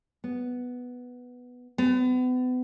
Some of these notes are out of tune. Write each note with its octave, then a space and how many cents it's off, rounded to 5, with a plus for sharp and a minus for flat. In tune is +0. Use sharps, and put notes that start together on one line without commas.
B3 +0
B3 +35